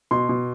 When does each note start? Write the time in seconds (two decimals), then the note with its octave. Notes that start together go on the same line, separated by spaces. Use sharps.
0.11 B2 C6
0.29 B2